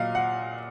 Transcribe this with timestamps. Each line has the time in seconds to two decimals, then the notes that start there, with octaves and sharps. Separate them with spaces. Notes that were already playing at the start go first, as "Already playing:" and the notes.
Already playing: A#2 F#3 D#5 F5
0.15 F#5